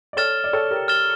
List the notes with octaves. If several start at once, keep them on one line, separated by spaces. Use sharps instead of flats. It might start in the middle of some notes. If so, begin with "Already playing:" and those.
D5
A4 C#5 F6 A6 E7 G7
D5
A4 C#5
G4 A#4
F6 A6 E7 G7